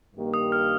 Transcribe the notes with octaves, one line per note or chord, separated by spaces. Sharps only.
G2 D#3 A#3 G4
D#6
F6